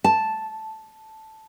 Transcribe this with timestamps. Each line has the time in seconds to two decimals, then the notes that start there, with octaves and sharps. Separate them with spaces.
0.04 A5